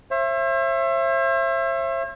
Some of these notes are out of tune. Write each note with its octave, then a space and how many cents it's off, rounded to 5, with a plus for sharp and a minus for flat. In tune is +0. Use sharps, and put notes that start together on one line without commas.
C5 +45 E5 +25